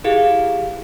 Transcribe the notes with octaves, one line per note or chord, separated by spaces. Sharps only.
E4 G4 G#4 F5